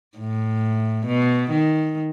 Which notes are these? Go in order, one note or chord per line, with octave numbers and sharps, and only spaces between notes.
A2
B2
D#3